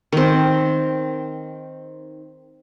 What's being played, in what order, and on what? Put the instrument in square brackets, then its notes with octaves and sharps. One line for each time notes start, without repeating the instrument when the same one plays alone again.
[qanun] D#3 C4